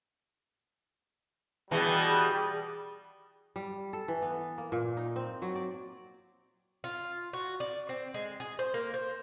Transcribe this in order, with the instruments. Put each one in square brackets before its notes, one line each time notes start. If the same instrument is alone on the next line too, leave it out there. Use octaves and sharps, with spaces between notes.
[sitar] B2 E3 [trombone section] G3 [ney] G#4
[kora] G3
A4
E3
B3
A#3
A#2
D#4
C4
F#3
D5
[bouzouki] F4
F#4
D5
C4
G#3
G#4
C5
A#3
C5